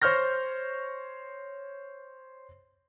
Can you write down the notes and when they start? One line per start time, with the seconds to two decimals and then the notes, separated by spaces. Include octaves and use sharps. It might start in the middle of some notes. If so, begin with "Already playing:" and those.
0.02 C5 C#5 C#6 F6 G6 A#6